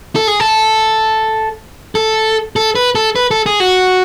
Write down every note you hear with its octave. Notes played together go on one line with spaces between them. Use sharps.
A4
G#4
A4
A4
A4
B4
A4
B4
A4
G#4
F#4